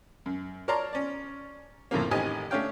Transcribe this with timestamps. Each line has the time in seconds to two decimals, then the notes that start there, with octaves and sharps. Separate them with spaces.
0.26 F#2
0.68 A#4 C#5 D5 A5 A#5 C6
0.93 C#4 D5
1.91 F2 A2 C#3 A#3
2.11 A1 D#3 C4 G4 D#5 G#5
2.51 A3 C#4 D4 C#5 F5 G5